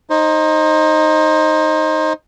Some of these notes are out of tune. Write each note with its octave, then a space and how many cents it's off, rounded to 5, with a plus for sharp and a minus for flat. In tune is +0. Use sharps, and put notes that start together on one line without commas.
D#4 +0 C5 +25